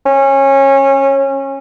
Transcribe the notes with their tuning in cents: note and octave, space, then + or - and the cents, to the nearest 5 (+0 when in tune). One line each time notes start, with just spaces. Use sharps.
C#4 -25